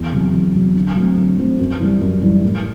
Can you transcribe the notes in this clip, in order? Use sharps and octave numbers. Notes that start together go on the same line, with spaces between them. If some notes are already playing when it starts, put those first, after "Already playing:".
Already playing: E2
C3 F#3
E2
C3 F#3
D3
F#3 A3 C4
D3
F#3 A3 C4
F#2
E3 G3
F#2
E3 G3
A2